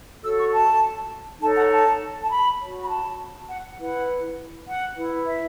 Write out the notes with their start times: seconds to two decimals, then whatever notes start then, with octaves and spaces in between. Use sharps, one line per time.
0.22 F#4 A4 C#5 E6
0.38 C#6
0.53 A5
1.41 D#4 A4 C#5 A5
1.56 F#5
1.71 A5
2.23 A5
2.30 B5
2.60 F#4 C#5
2.82 B5
2.89 A5
3.49 F#5
3.78 E4 B4 F#5
4.67 F#5
4.96 E4 B4
5.26 E5